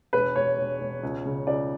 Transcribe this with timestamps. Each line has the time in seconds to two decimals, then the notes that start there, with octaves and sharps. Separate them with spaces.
0.13 E1 B4
0.36 E1 C#5
0.58 E1
0.81 E1
1.03 C#2
1.26 C#3
1.47 C#2 D5